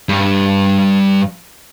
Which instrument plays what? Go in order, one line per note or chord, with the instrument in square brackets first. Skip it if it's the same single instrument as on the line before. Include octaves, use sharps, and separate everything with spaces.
[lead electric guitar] G2 G3